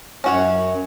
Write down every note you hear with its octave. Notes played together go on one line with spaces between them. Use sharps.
F#2 C#4 F#4 C#5